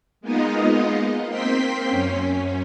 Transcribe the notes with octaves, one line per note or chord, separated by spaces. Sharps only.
G#3 A#3 B3 D#4 F4 D#5
A#3 C4 G5 C6 B6
F#2 C#4